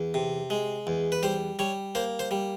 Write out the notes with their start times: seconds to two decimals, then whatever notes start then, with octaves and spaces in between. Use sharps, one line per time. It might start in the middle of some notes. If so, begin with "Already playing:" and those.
Already playing: E2
0.14 C3
0.50 G#3
0.87 E2
1.12 B4
1.23 G3 C5
1.59 G3 C#5
1.95 A#3 C5
2.19 C5
2.31 G3